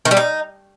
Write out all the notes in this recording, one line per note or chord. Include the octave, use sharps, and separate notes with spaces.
D#3
G3
D#4